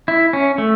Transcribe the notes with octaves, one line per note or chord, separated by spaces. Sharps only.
E4
C#4
A3